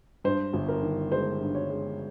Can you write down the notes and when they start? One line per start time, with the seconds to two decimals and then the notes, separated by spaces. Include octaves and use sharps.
0.24 G2 C5
0.53 G1
0.69 A#4
0.83 D#3
1.11 G#3 C5
1.40 G2
1.55 C#5
1.70 G#3